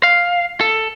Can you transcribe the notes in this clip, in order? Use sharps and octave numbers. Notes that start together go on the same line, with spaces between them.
F5
A4